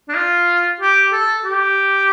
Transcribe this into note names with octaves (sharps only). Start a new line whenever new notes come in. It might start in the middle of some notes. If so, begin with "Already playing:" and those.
D4
F4
G4
A4
G4